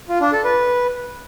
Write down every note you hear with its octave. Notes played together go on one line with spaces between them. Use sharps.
F4
D4
A4
B4